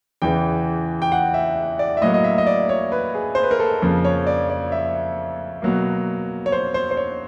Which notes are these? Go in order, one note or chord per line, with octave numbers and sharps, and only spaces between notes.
E2 C#3 E3 G5
G5
F#5
E5
D5
E5
A2 F#3 A#3 D#5
D#5
E5
D#5
D5
C#5
B4
G#4
C5
B4
A#4
A4
F2 C#3 F3 A#3
C#5
D5
D5
E5
B2 F#3 A#3
C#5
C5
C5
C5
C#5